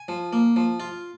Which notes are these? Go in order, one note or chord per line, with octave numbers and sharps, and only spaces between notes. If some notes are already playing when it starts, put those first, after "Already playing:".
Already playing: G#5
F3
A#3
F3
F4